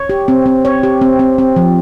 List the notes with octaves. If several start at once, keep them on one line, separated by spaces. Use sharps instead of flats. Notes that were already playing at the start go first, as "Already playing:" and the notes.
Already playing: C#5
G4
C4
C4
C#5
G4
C4
C4
C4
F3